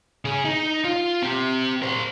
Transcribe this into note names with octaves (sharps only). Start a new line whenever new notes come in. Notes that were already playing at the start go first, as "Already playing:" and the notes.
C#3 G#4
D#4
F4
C4 G4
A#4 C5